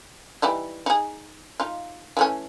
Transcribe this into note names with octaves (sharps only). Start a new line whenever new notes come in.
E3 G3 D#4
D#4 G#4
D#4 F4
E3 A3 C#4